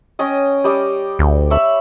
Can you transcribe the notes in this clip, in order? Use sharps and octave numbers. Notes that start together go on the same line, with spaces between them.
C#4 D#5 G5
G3 D#5 D6
D2
C#5 E5 B5